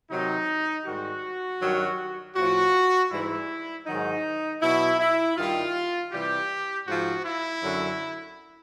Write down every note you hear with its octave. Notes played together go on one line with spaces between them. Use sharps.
C3 D#3 F#3 D#4
G#2 D#3 G3 F#4
G2 D#3 F#3
A2 F3 F#4
G#2 E3 G3 E4
G#2 D#3 F#3 D#4
B2 F#3 E4
E4
G2 D#3 G3 F4
C3 E3 G3 G4
G#2 F3 F#4
E4
F#2 D3 F#3